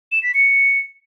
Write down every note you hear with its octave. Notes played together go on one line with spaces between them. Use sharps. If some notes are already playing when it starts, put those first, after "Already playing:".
E7
B6
C#7